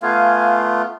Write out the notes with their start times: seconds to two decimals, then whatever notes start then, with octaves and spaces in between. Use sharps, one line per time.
0.02 A3 B3 F4 F5 G#5